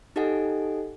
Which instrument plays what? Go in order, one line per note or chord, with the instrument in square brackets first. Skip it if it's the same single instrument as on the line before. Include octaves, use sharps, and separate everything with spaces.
[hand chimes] D#4 G4 A4 D#5 F#5 G#5